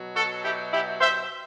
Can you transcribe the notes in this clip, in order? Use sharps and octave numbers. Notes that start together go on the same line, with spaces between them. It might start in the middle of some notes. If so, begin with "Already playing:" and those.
Already playing: B2 F#3
F#4 A4
E4 G4
E4 G4
C5 E5